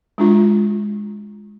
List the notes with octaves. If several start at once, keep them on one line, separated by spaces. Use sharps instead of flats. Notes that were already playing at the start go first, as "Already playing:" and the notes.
G#3 D4 F4